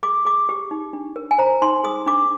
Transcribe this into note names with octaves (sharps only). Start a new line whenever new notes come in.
G#4 D6
G#4 D6
G4
D#4
D4
A#4
G#5
C5 A#5
D#4 C6
G#4 D#6
D4 D6